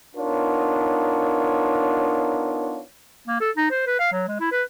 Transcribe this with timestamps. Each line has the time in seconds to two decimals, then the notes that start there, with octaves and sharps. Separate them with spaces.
0.16 B3 D4 D#4 F4 A#4 C#5
3.28 A#3
3.41 A4
3.57 D#4
3.71 C5
3.87 B4
3.99 F5
4.12 F#3
4.28 G#3
4.40 E4
4.52 B4